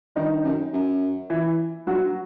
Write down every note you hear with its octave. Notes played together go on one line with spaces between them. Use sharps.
G2 D#3 D#4
F#2
F#2
E3 E4
G2 F#3 F#4